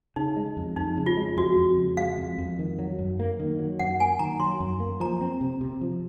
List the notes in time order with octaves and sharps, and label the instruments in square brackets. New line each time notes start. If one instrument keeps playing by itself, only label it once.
[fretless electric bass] C#3 [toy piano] D#4
[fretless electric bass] G#3
F2
[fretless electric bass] F2 [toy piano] D#4
[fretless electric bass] C#3
[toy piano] F4
[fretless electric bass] G#3
[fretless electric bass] F2 [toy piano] F#4
[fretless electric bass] F2
C#3
[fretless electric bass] G#3 [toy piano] F5
[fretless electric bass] F2
F2
D#3
F#3
F#2
A#3
D#3
F#3
[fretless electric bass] F#2 [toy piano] F#5
[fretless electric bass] A#3 [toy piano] G#5
[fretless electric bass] D#3 [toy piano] A#5
[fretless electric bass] F#3 [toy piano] C6
[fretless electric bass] F#2
A#3
[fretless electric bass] F3 [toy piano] A#5
[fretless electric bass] C4
C3
C3
F3